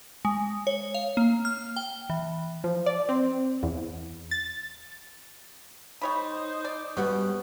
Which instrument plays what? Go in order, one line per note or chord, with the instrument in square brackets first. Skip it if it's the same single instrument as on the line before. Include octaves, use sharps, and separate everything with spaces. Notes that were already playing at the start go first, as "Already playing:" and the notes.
[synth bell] G#3
C#5
F5
A#3
F6
G5
E3
[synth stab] F3
D5
C4
E2
A6
[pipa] G3 C#5 B5 [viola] D#4 C5
[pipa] D5
[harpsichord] B2 [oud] G3 B3 C#4